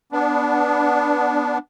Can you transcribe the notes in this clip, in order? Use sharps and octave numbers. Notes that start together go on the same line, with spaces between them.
B3 D4